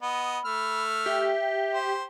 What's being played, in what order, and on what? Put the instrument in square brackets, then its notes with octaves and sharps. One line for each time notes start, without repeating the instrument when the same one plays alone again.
[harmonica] B3 D#5 [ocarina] B5
[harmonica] A3 E6 F6
[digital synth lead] G4 [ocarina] E5
[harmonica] C5